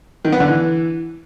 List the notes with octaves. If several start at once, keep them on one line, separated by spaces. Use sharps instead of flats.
D#3
B3
D3
E3